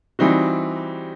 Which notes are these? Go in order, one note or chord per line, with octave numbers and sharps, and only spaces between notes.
E3 G3 C4 D#4 F#4